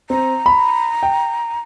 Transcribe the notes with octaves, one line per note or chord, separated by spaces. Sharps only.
C4 A#5
B5
G5